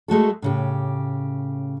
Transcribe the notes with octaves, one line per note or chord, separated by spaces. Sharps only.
G#3 A3 F#4 A4
A2 C#3 G4